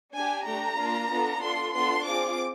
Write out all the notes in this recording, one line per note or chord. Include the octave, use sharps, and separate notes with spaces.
D4 G4 G#5
A3 D4 G4 A#5
A#3 D4 F4
B3 D4 F4 A4
D4 F4 A4 C6
B3 D4 F4 A4 C6
C4 F4 G#4 D6